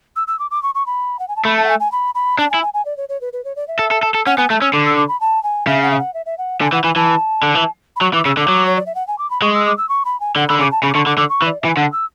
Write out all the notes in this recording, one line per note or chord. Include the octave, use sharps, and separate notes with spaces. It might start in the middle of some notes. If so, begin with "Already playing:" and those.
E6
E6
D6
D6
C#6
C#6
B5
F#5
G#5
A5
A3 B5
A5
F#5
G#5
G#5
B5
B5
D4 A5
G#5
E4
G#5
G#5
D5
C#5
C#5
B4
B4
C#5
D5
E5
A4
A4
A4
A4
C#4 F#5
B3 G#5
A3 A5
C#4 E6
D3 D6
E6
D6
B5
A5
G#5
C#3 E5
F#5
E5
F#5
E5
E5
F#5
D3 G#5
E3 F#5
E3 G#5
E3 A5
D3
E3
B5
F#3 C#6
E3 D6
C#3 E6
D3 D6
F#3
C#5
D5
E5
F#5
G#5
D6
B5
G#3 C#6
E6
D6
E6
C#6
B5
G#5
D3 F#5
D3 B5
C#3 D6
A5
C#3 B5
D6
D3 C#6
D3 D6
D3 D6
C#6
E3
D5
E3 E5
G#5
D3 F#5
E6